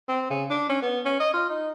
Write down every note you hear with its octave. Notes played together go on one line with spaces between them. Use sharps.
C4
C#3
D4
C#4
B3
C#4
D#5
F4
D#4